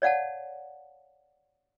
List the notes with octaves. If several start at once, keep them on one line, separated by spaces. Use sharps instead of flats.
C#5 D5 F5 F#5 A5